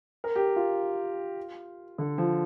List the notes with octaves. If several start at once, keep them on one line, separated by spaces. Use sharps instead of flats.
A#4
G4
F4
D3
F3